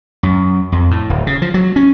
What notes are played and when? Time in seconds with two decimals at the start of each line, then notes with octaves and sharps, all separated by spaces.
0.23 F#2
0.72 F2
0.91 A2
1.10 D1
1.27 C#3
1.42 F3
1.54 F#3
1.76 C#4